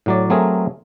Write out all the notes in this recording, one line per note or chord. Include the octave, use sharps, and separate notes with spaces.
A2 F#3 D5
F#3 A3 C4 G#4 A#4